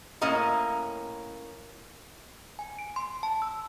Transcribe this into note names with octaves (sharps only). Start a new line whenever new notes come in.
A2 A#3 C#4 D#5 A#5
G#5
D7
C6
A5
E6